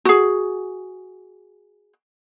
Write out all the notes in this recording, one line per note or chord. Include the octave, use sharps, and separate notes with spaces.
F#4 G#4